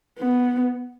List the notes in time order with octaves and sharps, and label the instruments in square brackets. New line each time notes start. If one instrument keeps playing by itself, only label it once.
[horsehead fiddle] B3